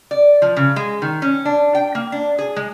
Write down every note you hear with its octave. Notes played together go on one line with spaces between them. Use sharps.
D5
F3
C#3
G#3
D#3
C#4
D4
G5
A#3
D4
G#4
G#3